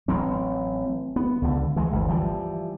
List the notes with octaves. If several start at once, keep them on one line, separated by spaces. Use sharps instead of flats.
A1 F#3 C4
B3
C#2 D3
E3 G#3
G1 D2
E3 F3 G3